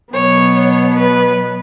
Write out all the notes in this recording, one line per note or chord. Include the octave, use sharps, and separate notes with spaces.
B2 F#3 B3 C#5
B4